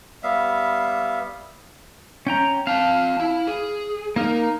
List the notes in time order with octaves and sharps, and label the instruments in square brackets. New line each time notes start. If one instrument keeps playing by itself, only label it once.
[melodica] G3 B3 E5 F5
[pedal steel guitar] C#4 G5 A#5
[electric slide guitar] C4 A5 [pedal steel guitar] F5
[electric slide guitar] E4
G#4
[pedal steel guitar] A#3 A#4 [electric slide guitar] D#4